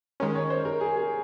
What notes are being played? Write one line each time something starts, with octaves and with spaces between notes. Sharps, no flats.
D#3 G#3 C#4 A#4
C#5
C5
A#4
G#4
G#4